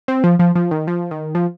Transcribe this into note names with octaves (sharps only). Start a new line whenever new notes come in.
C4
F3
F3
F3
D#3
F3
D#3
F3